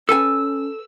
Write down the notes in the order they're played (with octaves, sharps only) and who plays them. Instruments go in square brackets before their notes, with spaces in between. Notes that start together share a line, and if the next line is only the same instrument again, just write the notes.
[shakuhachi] C#4 [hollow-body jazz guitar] A4 B4 G#5 [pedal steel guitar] E6